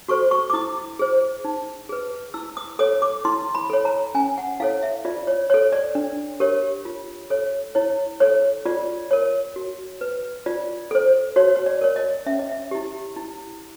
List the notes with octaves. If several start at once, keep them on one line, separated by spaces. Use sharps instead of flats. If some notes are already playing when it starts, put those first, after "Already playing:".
F#4 A4 C5 C#6
C#6
D6
E4 D#6
G#4 C5
D#4
G#4 B4
E4 E6
D#6
A4 C#5 D#6
D6
E4 C6
B5
A4 C#5
A#5
C#4 G#5
F#5
E4 A4 C#5 F5
E5
F4 D5
C#5
A4 C#5
D5
D4
G4 A#4 C#5
F4
A4 C#5
E4 C#5
A4 C#5
F4 D5
A#4 C#5
F#4
B4
F4 D5
A4 C5
F#4 C#5
C#5
D5
A#4 C#5
D#5
C#4 E5
D#5
E5
E4 G4
E4